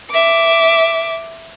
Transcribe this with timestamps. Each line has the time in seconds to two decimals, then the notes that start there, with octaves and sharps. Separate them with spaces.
0.11 E5 D6